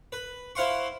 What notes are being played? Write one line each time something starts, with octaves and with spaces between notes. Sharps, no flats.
B4
E4 C5 F5 F#5 C6 C#6